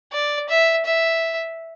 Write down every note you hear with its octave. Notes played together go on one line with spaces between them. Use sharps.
D5
E5
E5